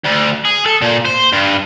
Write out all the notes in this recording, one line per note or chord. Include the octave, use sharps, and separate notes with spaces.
D2
G#4
A4
A#2
C5
G2